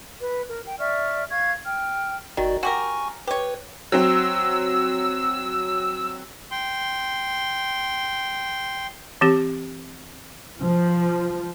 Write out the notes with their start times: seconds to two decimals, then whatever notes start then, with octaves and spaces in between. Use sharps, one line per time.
0.22 B4
0.48 A#4
0.65 G5
0.79 D5 E5 C#6 F6
1.30 F5 C#6 G#6
1.65 G5 F6
2.37 G1 D#3 F#4 D5
2.63 F#4 G4 A#4 G#5 C#6
3.27 G4 B4 C#5
3.92 F#3 C4 E6
6.51 G5 C6
9.21 E3 C4 G4
10.60 F3